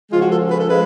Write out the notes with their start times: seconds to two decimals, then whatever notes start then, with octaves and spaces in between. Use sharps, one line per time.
0.11 C#3 F3 G#3 F4
0.21 F#4
0.30 A4
0.50 B4
0.59 A4
0.68 F3 G#3 B4